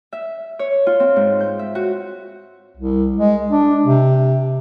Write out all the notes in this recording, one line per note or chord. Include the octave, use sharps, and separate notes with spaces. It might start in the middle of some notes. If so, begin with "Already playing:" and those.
E5
C#5
F4
C4
G#2
G6
E5
F#4
C2
G#3
D4
C3